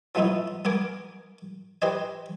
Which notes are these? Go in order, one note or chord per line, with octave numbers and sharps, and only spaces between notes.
F3 F#3 A3 B3 D#4 E4
B3 A#4 G#5 D6
G4 B4 C5 D#5 G#5